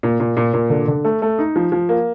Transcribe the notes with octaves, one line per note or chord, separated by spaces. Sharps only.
A#2
A#2
A#2
A#2
D3
D3
A3
A3
D#4
F3
F3
A#3